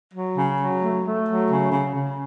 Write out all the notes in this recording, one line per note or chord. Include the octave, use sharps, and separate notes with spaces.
F#3
C#3
F#3
A3
A3
F#3
C#3
C#3
C#3